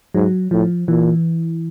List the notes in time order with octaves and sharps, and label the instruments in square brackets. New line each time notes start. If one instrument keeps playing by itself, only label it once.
[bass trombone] G#2 [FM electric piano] F#3
[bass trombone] A2 [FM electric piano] F3
[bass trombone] A#2 [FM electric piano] E3